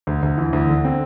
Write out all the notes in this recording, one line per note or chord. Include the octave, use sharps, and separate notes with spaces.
D2
D2
E3
D2
D3
C4